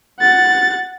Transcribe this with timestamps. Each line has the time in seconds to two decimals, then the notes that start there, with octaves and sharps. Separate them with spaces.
0.20 F#5 A6